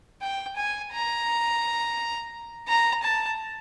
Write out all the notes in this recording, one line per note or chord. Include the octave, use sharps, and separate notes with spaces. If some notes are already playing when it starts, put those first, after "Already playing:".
G5
G#5
A#5
A#5
A5